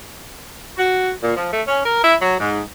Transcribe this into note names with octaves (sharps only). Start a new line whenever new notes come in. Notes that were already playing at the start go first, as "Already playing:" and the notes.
F#4
A#2
F3
A3
C#4
A#4
E4
F#3
G#2